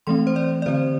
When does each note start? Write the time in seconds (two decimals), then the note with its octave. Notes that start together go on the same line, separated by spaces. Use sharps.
0.07 E3 A3 C4 C6
0.27 C5
0.36 D5
0.62 D5
0.66 D3 C4 C5